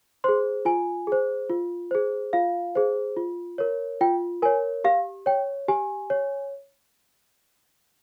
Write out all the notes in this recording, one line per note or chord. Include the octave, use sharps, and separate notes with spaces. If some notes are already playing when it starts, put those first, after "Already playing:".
G#4 C5 C6
F4 G#5
G#4 C5
F4
G#4 C5
F4 F5
G#4 C5
F4
A#4 C#5
F4 G5
A#4 C#5 G#5
G4 F5
C#5 G5
G4 G#5
C#5